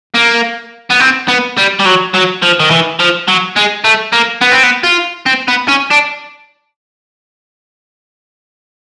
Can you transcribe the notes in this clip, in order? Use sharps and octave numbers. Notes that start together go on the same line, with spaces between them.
A#3
B3
C4
B3
G3
G3
F#3
F#3
F3
D#3
E3
F3
F#3
G#3
A3
A#3
B3
C4
B3
F4
C4
B3
C#4
D4